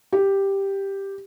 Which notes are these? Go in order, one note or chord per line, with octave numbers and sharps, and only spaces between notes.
G4